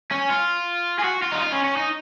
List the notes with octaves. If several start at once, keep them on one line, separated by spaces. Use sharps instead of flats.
C#4
F4
G#4
F#4
F4
D#4
F4
C#4
C#4
D#4